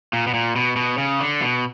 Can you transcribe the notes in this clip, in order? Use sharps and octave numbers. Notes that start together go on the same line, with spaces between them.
A#2
B2
A#2
B2
B2
C#3
D3
B2